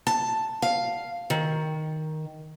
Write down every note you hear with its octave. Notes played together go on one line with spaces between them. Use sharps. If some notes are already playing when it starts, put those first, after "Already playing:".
A5
F5
D#3